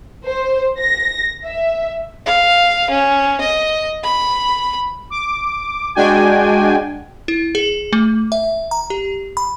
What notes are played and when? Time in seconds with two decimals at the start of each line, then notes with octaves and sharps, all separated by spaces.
0.25 C5
0.79 A#6
1.47 E5
2.26 F5
2.90 C#4
3.40 D#5
4.03 B5
5.10 D6
5.95 G#3 D4 F#4 G5 G#5
7.28 E4
7.55 G#4
7.93 A3
8.32 E5
8.71 A#5
8.90 G4
9.37 B5